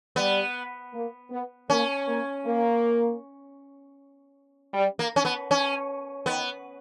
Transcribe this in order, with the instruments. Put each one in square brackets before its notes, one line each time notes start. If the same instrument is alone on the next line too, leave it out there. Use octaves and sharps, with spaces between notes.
[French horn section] G3 [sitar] B3
[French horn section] A#3
B3
[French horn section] A#3 [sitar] C#4
[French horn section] A#3
A#3
G3
[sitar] A#3
C#4
B3
C#4
[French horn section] D#3 [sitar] B3